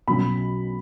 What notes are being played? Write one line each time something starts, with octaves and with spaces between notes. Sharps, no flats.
B1 B2 F#3 C#4 B5